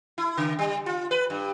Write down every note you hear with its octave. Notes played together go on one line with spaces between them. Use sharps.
E4
C#3
G3
F4
B4
G2